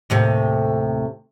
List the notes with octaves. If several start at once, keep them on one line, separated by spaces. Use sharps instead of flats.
D#2 A2 C3